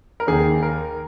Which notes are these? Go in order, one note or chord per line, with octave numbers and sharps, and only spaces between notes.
A#4
D#2 D#3 G#4
A#4